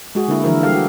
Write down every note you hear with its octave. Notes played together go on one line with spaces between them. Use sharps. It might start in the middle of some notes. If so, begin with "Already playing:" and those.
G#3 F#4 G#4
D3 A#3 E4
D3 E3 F3 E4 A#4
G3 G4 A4 F5
F#4